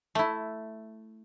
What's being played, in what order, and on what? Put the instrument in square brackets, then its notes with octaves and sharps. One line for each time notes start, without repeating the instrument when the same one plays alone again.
[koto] A3 E4